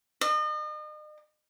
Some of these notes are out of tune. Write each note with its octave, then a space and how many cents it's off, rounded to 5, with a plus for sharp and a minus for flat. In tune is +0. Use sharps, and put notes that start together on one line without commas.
D#5 -40